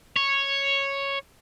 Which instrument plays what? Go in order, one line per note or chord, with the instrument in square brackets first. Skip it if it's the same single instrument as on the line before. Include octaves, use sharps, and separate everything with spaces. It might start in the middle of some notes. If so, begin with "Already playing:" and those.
[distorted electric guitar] C#5